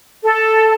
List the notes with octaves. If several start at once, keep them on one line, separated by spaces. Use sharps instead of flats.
A4